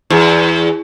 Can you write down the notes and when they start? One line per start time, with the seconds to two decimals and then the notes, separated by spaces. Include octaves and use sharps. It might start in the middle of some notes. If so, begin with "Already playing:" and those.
0.10 E2